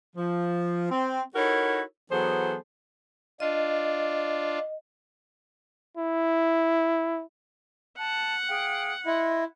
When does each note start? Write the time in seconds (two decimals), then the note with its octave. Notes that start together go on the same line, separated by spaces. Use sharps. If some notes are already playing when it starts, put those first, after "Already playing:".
0.16 F3
0.90 C4
1.35 D#4 E4 F#4 A4 A#4 C#5
2.11 E3 F#3 B3 G#4 A4 C5
3.40 D4 F4 D#5
5.97 E4
7.98 F#5 A5
8.49 G#4 F5 G5
9.06 E4 D#5 C6